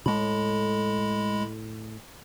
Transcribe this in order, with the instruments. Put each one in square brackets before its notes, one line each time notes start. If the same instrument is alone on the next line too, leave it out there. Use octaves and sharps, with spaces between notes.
[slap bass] A2 [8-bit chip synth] G#3 B5